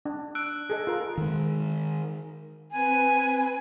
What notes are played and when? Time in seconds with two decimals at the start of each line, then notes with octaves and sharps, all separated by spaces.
0.05 D4
0.35 E6 F#6 D7
0.70 G#4 A4 D#5
0.87 F4 A#4
1.18 D#3 G#3
2.72 C4 B4 G#5